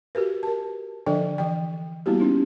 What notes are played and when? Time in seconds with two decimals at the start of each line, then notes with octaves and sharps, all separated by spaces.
0.15 F#4 G4 A#4 B4
0.43 A#4 A5
1.06 D3 F3 D4 A4 D5 G5
1.38 E3 G5
2.06 G3 A#3 B3 E4 F#4 G4
2.20 C#4 D#4